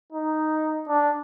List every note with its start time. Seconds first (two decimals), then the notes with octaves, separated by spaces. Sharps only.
0.12 D#4
0.89 D4